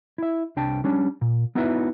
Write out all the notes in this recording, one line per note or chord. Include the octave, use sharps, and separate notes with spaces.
E4 E5
C2 D4 G5 A5
G3 C#4 D4
A#2
B3 D#4 E4 F#4 B4 E5